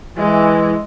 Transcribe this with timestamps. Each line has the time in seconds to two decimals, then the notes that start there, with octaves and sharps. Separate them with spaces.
0.17 E3 G#3